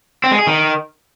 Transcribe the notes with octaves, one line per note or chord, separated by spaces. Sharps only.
C4
G#3
G#4
D#3